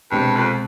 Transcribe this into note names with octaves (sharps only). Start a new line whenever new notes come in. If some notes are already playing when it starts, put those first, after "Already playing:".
C2 G2 B2 G#3 C4
F2